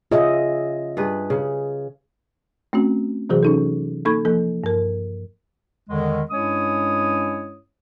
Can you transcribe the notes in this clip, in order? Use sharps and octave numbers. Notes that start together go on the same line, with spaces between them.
C#3 F4 D#5 E5
G2 G#4 B4
C#3
A3 C4 C#4 F#4
C3 E3 F#3 F#4 G#4 C5
C#4 D#4 A4
A#3 D#4 A4 B5 C#6 G#6
F3 A#3 A4
G2 A#4
E2 D3 D#3 G#3
G2 G#3 C#4 E4 C#5 D#6